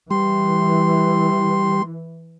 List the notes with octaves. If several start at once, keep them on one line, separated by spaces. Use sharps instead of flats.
E3 G3 C6